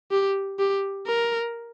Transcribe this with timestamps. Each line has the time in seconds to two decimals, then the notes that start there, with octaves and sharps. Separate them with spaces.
0.11 G4
0.59 G4
1.07 A#4